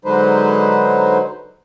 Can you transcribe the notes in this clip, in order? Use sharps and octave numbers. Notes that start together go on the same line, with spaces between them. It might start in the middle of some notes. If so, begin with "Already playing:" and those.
D3 F#3 G#3 D#4 B4 C5